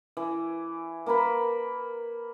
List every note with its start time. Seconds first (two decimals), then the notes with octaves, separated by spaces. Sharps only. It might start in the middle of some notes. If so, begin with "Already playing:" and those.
0.17 E3
1.06 A#3 A#4 B4 B5